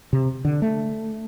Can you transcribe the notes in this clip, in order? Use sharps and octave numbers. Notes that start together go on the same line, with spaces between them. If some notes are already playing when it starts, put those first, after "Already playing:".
C3
D3
A3